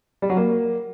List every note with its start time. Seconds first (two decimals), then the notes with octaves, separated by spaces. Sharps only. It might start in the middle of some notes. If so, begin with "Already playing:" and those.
0.22 G3
0.30 F#3
0.37 A#3